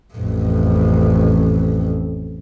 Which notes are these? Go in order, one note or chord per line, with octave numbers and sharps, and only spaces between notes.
A1 F2